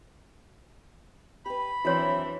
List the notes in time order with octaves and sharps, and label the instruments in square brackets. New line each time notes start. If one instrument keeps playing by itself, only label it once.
[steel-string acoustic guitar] G4 B4 [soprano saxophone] B5
[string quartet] E3 D4 [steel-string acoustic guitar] F#3 C4 E4 [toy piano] F#4 C#5 C6